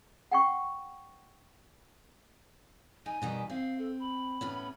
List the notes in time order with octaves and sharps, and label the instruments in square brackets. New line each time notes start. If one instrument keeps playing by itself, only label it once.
[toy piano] F#5 G5 C#6
[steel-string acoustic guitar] D#4 [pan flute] G#5
[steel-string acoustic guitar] B2 D#3 G3
[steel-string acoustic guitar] C4 [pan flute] F5
[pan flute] A4
B5
[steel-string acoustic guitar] A2 B3 C#4